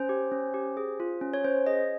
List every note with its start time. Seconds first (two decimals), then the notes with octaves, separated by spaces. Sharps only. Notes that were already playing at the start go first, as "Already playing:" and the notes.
Already playing: C#4 C5
0.09 G4
0.32 C#4
0.54 G4
0.77 G#4
1.00 F4
1.21 C#4
1.34 C#5
1.44 C#4 C5
1.66 G#4 D#5